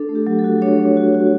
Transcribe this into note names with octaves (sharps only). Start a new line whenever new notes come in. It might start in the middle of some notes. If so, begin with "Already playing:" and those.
Already playing: D4 A4
A3
G4
F#3
A4
F#4
D4 C#5
D4
F#4
F#4